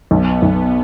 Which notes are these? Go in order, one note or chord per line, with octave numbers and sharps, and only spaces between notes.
B1 B3
B1